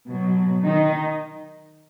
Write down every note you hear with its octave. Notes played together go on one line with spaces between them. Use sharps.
B2 F#3
D#3 D#4